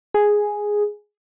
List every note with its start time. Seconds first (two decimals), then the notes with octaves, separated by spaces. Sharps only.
0.14 G#4